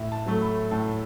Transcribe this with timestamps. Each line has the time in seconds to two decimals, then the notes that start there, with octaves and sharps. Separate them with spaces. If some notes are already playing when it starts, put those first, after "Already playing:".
Already playing: A2 E5
0.12 A5
0.26 F#3 A3
0.41 B5
0.71 A2 A5